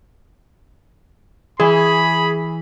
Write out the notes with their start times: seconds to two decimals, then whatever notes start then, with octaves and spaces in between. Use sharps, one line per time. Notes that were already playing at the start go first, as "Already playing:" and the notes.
1.60 E3 G#4 B5